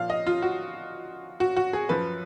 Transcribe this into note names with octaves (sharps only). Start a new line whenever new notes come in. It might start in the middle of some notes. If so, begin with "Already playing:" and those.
Already playing: A#2 F3 F5
D#5
F4
F#4
F#4
F#4
G#4
F#2 F3 B4